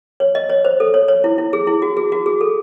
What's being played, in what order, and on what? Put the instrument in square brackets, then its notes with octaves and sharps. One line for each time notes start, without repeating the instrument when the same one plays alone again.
[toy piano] C#5
D#5
C#5
C5
A4
C#5
C#5
E4
E4
G#4
E4
F#4
G#4
F#4
G#4
A4